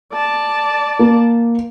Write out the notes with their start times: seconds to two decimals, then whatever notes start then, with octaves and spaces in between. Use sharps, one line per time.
0.13 D5 A5
0.99 A#3